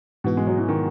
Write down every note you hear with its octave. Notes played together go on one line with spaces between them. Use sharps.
G#2 B2 E3 B3 F#4
G#3
F#3
E3
D#3